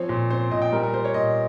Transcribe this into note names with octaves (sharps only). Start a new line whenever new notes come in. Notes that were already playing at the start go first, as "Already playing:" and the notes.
Already playing: F3 C4 C#5
A#2
C4 C5
A#2 D#5
G5
G3 A#4
A#4
G3 C5
C#5
A#2 D#5